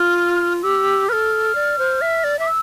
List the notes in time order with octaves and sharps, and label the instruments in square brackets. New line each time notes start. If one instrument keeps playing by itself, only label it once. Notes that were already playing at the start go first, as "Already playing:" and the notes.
Already playing: [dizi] F4 [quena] F6
[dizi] G4 [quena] E6
[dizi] A4 B4 [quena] F6
[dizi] D5
C5
E5
D5
[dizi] E5 [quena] D6
[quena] E6